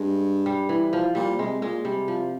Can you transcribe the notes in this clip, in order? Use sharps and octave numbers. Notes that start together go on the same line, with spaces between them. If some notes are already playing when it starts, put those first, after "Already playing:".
Already playing: G2 G#3
G3
E3
F3
A#2 G3
C3 G#3
A#2 G#3
C3 G3
F3